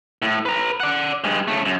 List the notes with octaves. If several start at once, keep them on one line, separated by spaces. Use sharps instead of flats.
A2
B4 A#5
D5 F#5
G2 G#3
C#3 A3
F#2